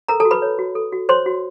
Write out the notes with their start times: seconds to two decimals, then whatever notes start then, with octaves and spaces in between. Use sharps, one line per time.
0.08 A4 A#4 A#5
0.20 A4 A5
0.25 F#4
0.31 B4 B5
0.42 C#5
0.59 F#4
0.75 A4
0.92 F#4
1.09 C5 C#5 C6
1.26 F#4